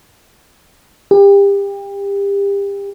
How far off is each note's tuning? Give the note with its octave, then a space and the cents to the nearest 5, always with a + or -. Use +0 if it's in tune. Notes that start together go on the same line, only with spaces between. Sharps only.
G4 +30